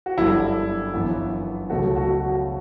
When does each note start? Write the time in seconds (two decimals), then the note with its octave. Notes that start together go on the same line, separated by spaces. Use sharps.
0.06 F#4
0.17 G1 F#2 D3 G3 E4
0.93 G1 F#2 E3 B3
1.70 C#2 B2 F#3 A3 F#4
1.96 F#4
2.21 F#4